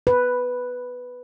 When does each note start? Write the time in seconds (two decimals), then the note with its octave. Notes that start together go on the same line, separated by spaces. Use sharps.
0.07 B4